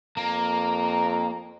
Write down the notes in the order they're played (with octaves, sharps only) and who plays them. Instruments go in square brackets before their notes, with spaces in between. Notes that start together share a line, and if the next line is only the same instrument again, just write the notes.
[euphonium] F2 [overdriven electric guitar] A#3 [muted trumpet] A#5